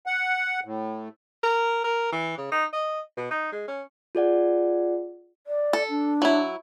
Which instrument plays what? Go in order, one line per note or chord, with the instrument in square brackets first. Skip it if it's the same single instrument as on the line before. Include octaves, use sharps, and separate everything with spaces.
[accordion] F#5
A2
[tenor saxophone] A#4
A#4
E3
C#3
D#4
D#5
B2
D#4
G#3
C#4
[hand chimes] F4 G#4 D5 F#5
[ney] D5
[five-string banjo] A4
[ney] D4
[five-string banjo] F#3 E4